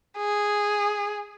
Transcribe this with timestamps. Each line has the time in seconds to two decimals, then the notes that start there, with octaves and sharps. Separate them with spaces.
0.18 G#4